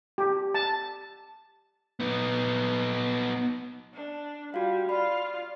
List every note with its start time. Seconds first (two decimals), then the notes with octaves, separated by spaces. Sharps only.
0.18 G4
0.54 A5
2.00 B3 D#4
3.94 D4
4.54 G3 F4 F#4 F5
4.89 F4 D5 B5